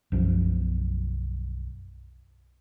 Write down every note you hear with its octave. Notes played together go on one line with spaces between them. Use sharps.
B1 F#2 F3 B3